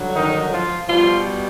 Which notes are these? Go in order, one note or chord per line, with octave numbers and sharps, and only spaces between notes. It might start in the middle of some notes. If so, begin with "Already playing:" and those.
Already playing: G2 D3 F#3
D#3 D#4
F3 F4
B2 F3 G3 F4